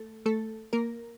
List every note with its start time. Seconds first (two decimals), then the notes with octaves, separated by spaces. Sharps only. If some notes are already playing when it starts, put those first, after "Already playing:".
Already playing: A3 A4
0.26 A3 A4
0.73 A#3 A#4